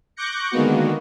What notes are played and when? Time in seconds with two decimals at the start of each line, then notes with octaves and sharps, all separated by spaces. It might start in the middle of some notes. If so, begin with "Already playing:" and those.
0.16 C#6 D6 F#6 G6 A#6 C#7
0.51 D3 D#3 G#3 A#3 B3 F#4